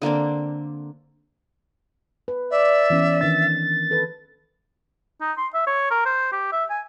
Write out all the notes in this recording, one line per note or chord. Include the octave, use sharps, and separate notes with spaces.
D3 A#3 C4 D4
B4
D5 E5
E3 B3 C#4
D#3 E3 D4 A6
A4 B4
D#4
C6
E5
C#5
A#4
C5
G4
E5
G#5